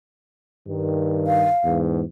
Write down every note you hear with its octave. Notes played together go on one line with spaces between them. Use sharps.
G2 D#3
F5
E2 G#2